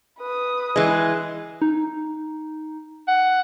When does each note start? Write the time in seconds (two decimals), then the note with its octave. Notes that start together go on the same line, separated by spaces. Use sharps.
0.19 B4 D#6
0.76 E3 G#3
1.62 D#4
3.08 F#5